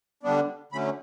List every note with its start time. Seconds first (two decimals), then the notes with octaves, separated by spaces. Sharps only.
0.23 D3 G3 B3 D4
0.72 D3 F#3 A3 C#4 B5